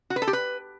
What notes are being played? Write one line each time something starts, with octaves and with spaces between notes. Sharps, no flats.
F#4
B4
A4
G4
B4